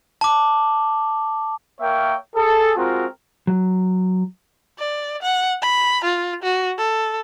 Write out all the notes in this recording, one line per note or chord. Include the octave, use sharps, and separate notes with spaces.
A5 D6
A#3 A#4 C#5 E5 G5
G#4 A4
G#3 C4 F4 F#4 A#4
F#3
D5
F#5
B5
F4
F#4
A4